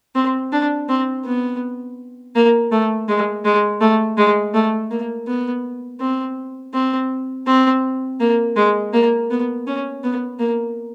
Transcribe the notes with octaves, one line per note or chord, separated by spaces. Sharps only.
C4
D4
C4
B3
A#3
A3
G#3
G#3
A3
G#3
A3
A#3
B3
C4
C4
C4
A#3
G#3
A#3
B3
C#4
B3
A#3